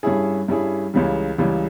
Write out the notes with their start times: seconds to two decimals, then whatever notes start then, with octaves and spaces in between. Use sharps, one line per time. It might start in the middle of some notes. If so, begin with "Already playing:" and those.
0.03 G2 G3 C#4 E4 G#4
0.48 G2 G3 C#4 E4 G#4
0.94 C#2 C#3 E3 G3
1.38 C#2 C#3 E3 G3